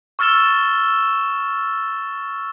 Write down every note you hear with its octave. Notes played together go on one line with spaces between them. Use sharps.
C#6 E6 F6 A6 E7 G7